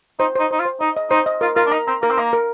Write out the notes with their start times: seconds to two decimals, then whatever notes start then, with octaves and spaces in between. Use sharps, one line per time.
0.19 D#4 C5
0.35 D#4 C5
0.51 D#4 C5
0.60 F4
0.65 C5
0.81 D#4 D#5
0.96 D#5
1.11 D#4 C5
1.26 D#5
1.41 F4 A#4
1.56 F4 A#4
1.67 D4
1.72 D#4 A#5
1.88 C4 A#5
2.03 A#3 A#4
2.11 C4
2.18 A#3 A#5
2.33 A#4